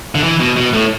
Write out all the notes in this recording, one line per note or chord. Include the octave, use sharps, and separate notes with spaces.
D3
E3
B2
B2
A2